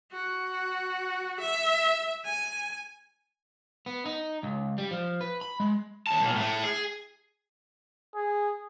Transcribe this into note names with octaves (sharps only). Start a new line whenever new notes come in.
F#4
E5
G#5
B3
D#4
C#2
G3
F3
B4
B5
G#3
D#2 A5
B1 A#2
A2 A3
G#4
G#4